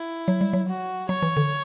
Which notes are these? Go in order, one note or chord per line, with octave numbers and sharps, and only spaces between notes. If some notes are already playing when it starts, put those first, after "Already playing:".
Already playing: E4
F#3
G3
F#3
F#4
F#3 C#5
E3
D3